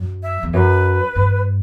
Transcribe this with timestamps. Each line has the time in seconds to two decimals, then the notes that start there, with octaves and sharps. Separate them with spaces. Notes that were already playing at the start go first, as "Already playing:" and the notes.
Already playing: F#2
0.23 E5
0.43 E2
0.53 F#2 B4
1.16 G2